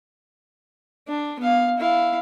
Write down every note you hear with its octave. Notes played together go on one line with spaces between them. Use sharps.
D4
B3 F5
E4 F5